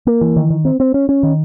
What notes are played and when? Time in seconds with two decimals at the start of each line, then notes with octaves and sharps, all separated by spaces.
0.07 A#3
0.21 E3
0.36 D#3
0.50 D#3
0.65 C4
0.80 C4
0.94 C#4
1.09 C#4
1.23 D#3